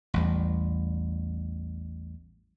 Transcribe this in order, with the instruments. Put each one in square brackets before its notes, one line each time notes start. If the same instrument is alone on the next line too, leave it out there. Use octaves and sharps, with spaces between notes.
[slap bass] A1 E2 G3